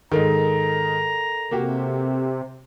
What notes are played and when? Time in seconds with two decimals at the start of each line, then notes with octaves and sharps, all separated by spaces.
0.12 G#2 D#3 A4 A#4 D#5 A#5
1.51 C3 A#3 F#4 G4